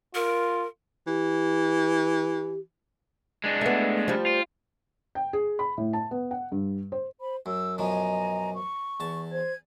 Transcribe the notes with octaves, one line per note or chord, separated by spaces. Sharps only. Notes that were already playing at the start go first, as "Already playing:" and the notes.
F4 A#4
E3 G4
G#3 D4
A3 B3
F3 G3
F4
G5
G#4
B5
A2
A5
B3
F#5
G2
C5
C5 B5
F#2 E6
F#2 B2 F3 D#5 G#5 A#5
C#6
E2 A5
C5 G#6